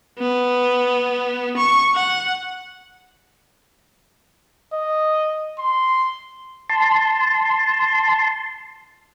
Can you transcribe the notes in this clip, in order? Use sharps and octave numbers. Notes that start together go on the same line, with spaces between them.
B3
C#6
F#5
D#5
C6
A5 C6